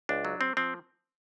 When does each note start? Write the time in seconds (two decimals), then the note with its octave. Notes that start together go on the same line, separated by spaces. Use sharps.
0.09 C#2 D4
0.25 F#3
0.41 C4
0.57 F3 C4